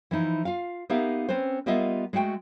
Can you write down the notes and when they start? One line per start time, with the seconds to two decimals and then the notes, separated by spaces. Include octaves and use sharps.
0.11 E3 F3 D#4 E4
0.45 F4 F5
0.89 A#3 B3 D#4 G4 E5 F5
1.29 C4 C#4 B4 C5
1.66 G3 A#3 B3 F4 D#5 E5
2.13 G#3 A3 F#4 F#5 G5